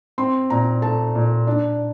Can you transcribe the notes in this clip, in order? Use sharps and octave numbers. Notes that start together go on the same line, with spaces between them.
C4 C6
A#2 A#5
A3 A5
A#2
D4